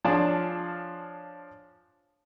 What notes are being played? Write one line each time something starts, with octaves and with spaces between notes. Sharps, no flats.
F3 D4 F4 G#4 C#5 A5